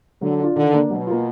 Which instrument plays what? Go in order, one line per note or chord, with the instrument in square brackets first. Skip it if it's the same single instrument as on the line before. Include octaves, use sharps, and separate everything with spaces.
[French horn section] D3 [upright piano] F#3
[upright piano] D4 F4
[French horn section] D3 [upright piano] D#3
[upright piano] A#3 D4
[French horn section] B2 [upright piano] F#3
[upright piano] A#3 F4